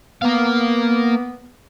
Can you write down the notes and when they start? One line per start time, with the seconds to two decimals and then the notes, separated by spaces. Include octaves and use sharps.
0.22 A#3 B3 F5